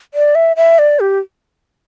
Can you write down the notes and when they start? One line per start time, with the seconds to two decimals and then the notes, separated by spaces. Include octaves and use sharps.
0.14 D5
0.35 E5
0.56 E5
0.79 D5
1.00 G4